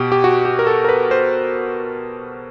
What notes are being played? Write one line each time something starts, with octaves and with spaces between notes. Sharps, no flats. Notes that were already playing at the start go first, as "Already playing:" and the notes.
Already playing: B2 G4
G4
F#4
G4
A#4
A4
A#4
B4
C5